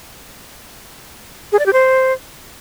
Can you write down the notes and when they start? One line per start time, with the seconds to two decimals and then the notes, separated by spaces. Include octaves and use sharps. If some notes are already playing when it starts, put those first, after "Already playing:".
1.52 G#4
1.59 D5
1.66 G4
1.73 C5